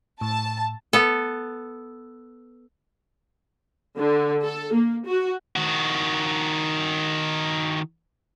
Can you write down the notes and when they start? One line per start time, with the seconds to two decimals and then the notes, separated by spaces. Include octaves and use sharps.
0.21 A2 A5
0.93 B3 A4
3.97 D3
4.44 A4
4.74 A#3
5.07 F#4
5.56 D#3 F#4